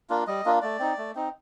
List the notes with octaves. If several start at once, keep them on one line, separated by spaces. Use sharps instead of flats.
A#3 D4 F4
G3 D#5
A#3 D4 F4
A3 D5
C4 D#4
A3
C4 D#4